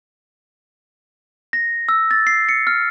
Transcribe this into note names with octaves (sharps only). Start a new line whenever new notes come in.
A#6
E6
A6
C7
C#7
F6